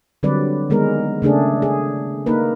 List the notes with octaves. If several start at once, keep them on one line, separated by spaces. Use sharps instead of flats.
D3 F#3 G3 C4 B4 D5
D#3 G#3 B3 A#4
C#3 A3 D4 G#4
G#4
A#3 D#4 A#4 B4